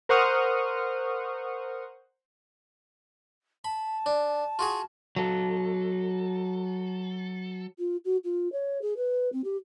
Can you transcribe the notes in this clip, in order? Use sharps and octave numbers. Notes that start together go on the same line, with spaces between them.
A#4 C5 F#5 C#6 D#6 F6
A5 B5
D4
F4 F#4 G#4
F#3 A4
F4
F#4
F4
C#5
G#4
B4
C4
G4